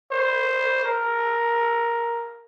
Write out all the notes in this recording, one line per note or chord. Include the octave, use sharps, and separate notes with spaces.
C5
A#4